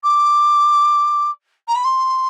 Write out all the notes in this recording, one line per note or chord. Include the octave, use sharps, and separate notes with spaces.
D6
A#5
B5
C6